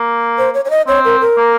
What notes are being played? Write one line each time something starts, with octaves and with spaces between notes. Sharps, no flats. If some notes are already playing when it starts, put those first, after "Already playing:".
Already playing: A#3
C5
C#5
C#5
D#5
C4 C#5
A#4
A#4
A#3